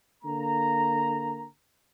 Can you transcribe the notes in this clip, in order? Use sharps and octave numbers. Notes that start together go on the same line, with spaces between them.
D3 A#3 A#5